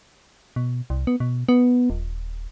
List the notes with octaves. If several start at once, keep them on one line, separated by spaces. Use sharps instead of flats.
B2
C2
B3
B2
B3
D#1